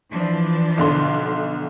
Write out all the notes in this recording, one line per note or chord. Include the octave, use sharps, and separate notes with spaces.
E3 F3 D4
B1 D3 C6